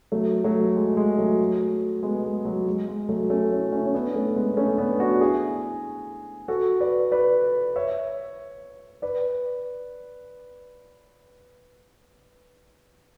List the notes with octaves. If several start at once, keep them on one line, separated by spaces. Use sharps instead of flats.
F#3 A3
F#3 A3
G#3
G#3
F#3 A3
G#3 B3
G#3
F#3
G#3
G#3
F#3 A3
A3 C#4
C#4 E4
C#4 E4
C#4
B3 D4
A3 C#4
G#3 B3
A3 C#4
B3 D4
D4 F#4
E4 G#4
F#4 A4
B4 D5
B4 D5
C#5 E5
B4 D5